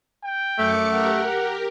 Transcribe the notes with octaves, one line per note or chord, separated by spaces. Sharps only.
G5
F#2 A3 D6 C#7
G4 A#4 F#5